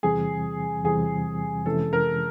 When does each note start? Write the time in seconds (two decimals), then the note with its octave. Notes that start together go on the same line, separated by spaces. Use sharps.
0.03 E2 C3 E3 G3 C4 G#4
0.84 E2 C3 E3 G3 C4 G#4
1.65 F2 C3 E3 G#3 C#4 A4
1.93 A#4